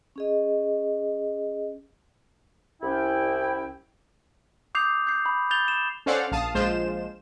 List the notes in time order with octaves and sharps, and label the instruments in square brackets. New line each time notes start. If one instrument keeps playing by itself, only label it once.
[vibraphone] C#4 G#4 D#5
[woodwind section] C2 C#4 E4 G5
[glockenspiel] D6 D#6 G6 C7 F7
G6 C7
B5
G6 A6 F7 G7
E7
[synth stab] C#4 A4 C5 D5 F5 F#5
A#1 F5 A5 D#6
A#1 F3 G#3 F4 C5 E7